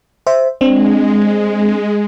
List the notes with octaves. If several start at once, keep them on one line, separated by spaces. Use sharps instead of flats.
C5 E5
G#3 C4 D4